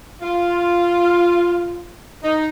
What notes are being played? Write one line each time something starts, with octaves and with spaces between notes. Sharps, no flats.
F4
D#4